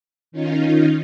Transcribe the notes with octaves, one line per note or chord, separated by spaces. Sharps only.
D#3 C#4 D#4 F4